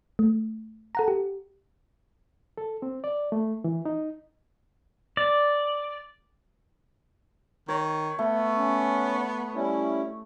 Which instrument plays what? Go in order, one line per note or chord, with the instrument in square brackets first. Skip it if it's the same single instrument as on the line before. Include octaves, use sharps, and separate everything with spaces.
[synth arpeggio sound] A3
A4 F#5 A#5
G4
[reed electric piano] A4
C4
D5
A3
E3
D#4
[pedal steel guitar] D5
[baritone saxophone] D#3 [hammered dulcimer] C#5
[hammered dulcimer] A3 [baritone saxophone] B3
[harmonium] C#4
G3 C#4 E4